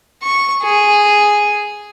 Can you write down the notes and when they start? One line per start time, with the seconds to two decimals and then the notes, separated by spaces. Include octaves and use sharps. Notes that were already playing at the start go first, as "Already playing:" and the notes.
0.23 C#6
0.63 G#4